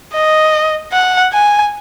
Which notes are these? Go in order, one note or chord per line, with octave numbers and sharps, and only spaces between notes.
D#5
F#5
G#5